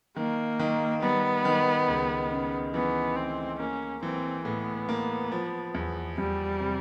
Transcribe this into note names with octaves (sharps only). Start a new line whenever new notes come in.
D#3 A#3
D#3
G3 B3
D#3
C#2
C#3
E3 B3
A3 C4
A#3 C#4
E3 C4
A2 B3
A#3
F3
E2
E2 G3
C3